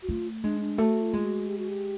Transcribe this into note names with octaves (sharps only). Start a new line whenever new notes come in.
F#4
A3 F4
G#3 D4
D4
A3 F#4
F4
G#3
F#4
G4
F#4
G4